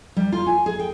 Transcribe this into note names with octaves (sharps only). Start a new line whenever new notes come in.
G3
F4
G#5
G#4
G5